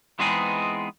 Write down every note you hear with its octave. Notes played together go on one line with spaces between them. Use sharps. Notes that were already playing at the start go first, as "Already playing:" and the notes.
E3 G#3 B3 C4 D#4 G#4